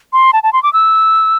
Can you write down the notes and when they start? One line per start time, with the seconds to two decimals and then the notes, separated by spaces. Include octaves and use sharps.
0.13 C6
0.33 A5
0.43 A5
0.53 C6
0.63 D6
0.73 E6